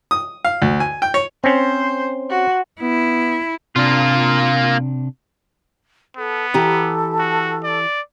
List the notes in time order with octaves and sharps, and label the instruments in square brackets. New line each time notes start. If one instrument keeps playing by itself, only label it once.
[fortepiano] D#6
F5
D2
G#5
G5
C#5
[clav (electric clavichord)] C4 C#4 [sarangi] C5
[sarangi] F#4
[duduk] B3 [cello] E4
[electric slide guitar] C3 D4 [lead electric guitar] A#3 F4
[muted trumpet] B3 [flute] A4
[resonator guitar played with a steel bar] E3 G4 A#5 [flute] A4
[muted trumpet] F#4
D5